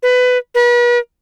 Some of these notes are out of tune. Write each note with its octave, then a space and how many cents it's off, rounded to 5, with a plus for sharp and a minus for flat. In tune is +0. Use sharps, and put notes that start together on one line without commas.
B4 +20
B4 -40